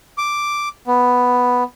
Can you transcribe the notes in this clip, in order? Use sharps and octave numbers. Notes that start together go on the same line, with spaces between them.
D6
B3